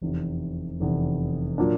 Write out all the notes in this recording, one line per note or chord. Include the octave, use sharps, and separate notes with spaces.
F1 E2 C3
F1 E2 C3
A#2 F#3 A#3 D4